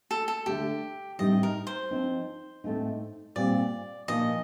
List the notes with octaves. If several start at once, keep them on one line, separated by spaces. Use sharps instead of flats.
A4
A4
D3 A3 D4 G4
A2 G3 C4 D#4 D#5
A#4
C5
F3 C4 D#4
A2 A3 C4 D#4
A#2 G3 C4 D5
A#2 F3 A#3 D#4 D#5